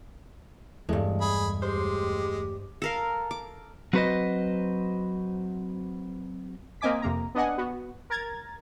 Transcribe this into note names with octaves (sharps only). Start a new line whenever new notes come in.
E2 G2 G#3 A3
G#4 B5
G#3 G4 C5
A4 A#4 F5
D6
F#3 C4 F#4 B4 C5 D#5
A#3 C4 D#5 G#5 D6 B6
F2 C3 A#3 A#5
B3 D4 D#5 F#5 G#5
B3 F#4
A#4 A#5 G#6 A6